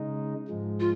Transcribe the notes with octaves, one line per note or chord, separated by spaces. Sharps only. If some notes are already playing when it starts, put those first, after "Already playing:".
Already playing: C#3 G#3 D#4
G#2 F3 G#3
F4